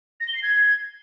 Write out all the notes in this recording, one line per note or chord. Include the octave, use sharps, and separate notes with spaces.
A#6
G7
C7
G#6